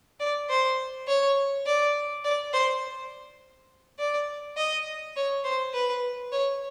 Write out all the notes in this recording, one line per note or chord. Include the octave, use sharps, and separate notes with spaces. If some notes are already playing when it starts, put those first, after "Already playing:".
D5
C5
C#5
D5
D5
C5
D5
D#5
C#5
C5
B4
C#5